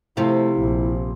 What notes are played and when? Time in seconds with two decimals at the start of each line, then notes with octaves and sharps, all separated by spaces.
0.17 C3 F3 A3 E4 F4
0.60 A#1